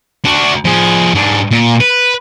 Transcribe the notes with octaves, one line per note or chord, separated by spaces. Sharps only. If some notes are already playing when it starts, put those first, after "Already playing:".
D4 F#4
F3 G#4
G#2 D4
A#2
B4